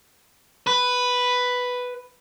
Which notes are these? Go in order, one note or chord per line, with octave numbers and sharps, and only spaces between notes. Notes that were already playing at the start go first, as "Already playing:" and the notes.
B4